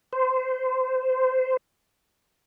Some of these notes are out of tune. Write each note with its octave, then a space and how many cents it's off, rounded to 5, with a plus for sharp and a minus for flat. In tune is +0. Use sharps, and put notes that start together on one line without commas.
C5 -20